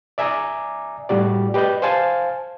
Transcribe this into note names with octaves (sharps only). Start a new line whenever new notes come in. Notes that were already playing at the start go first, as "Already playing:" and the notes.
D5 E5 G#5 A#5 D6 D#6
A2 G3 F#4 D5
G4 B4 D5 D#5 G6
C5 F5 G#5 A5